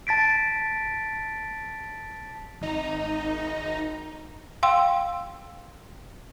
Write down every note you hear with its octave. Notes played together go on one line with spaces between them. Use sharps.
A5 A6 B6 D7
G#1 D#4 A#5
F5 G5 C6 E6